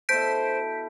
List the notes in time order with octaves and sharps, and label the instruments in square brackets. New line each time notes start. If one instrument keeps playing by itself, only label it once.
[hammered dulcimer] B2 E4 A4 [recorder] C5 [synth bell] G6 B6 D7